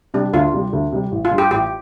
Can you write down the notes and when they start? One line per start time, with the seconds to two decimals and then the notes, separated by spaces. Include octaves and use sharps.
0.14 C3 G3 D4
0.33 D2 F4
0.53 C3 G3
0.73 D2
0.92 C3 G3
1.12 A1
1.25 F4
1.31 G2 G3
1.38 G4
1.51 A1 G4